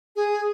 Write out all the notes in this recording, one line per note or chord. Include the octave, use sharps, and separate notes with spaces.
G#4